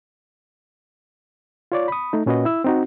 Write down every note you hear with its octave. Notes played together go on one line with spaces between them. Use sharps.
F4 C#5 D5
B5 D#6
A3 D#4
A#2 C#4 F#4 B4 D#5
E4 E6
C4 D#4 F#4